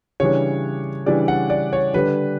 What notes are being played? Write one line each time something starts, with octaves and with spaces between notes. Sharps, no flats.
C#3 E3 G3 D4 C#5
C#3 E3 G3 D4 D5
F#5
D5
C#5
D3 G3 D4 B4